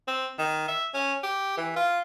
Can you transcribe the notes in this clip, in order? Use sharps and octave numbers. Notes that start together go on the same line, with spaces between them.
C4
D#3
E5
C#4
G4
E3
F4